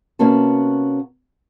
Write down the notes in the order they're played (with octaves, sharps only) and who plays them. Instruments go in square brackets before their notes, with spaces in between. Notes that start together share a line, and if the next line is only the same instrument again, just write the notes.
[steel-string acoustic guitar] C3 A#3 B3 C#4 F#4 A5